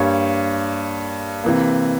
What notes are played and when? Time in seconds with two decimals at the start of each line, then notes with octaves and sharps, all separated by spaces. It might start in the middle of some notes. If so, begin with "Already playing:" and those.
Already playing: G2 G3 A#3 C#5
1.44 C3 E3 A#3